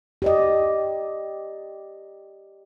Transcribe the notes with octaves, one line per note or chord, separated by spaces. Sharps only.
G4 D5 D#5